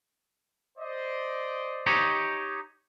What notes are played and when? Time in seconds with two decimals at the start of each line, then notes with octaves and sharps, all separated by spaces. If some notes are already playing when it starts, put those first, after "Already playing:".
0.78 C5 D5 D#5
1.86 D#4 G4 C#5